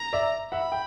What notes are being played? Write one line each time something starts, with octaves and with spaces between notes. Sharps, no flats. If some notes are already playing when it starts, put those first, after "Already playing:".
Already playing: A#5
D5 E5
E5 F#5 B5
G5